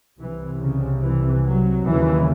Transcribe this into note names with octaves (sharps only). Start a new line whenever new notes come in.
C2 C3 E3
C#3
E3
F#3
D#2 C#3 E3